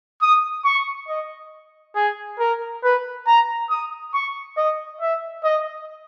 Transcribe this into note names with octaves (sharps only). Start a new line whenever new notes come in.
D#6
C#6
D#5
G#4
A#4
B4
A#5
D#6
C#6
D#5
E5
D#5